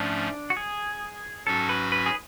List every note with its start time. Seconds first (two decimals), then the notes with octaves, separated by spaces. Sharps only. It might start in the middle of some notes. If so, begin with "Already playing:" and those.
Already playing: G#2 F3 A3 C#4 D4
0.50 F#4
0.57 G#4
1.46 G#2 F#3 C#4 F#4 A4
1.69 B4
1.92 B4
2.06 G#4